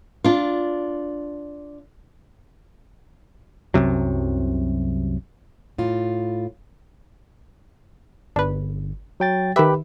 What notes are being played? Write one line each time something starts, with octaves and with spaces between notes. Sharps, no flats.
D4 F4
C2 F#2 C3 F#3
A2 F4
G1 D4 B4
F#3 G5 A6
D#3 G4 B4 E5 B5